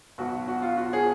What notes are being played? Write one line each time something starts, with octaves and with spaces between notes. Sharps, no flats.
B1 B2 F#4
F#4
F4
F#4
G#4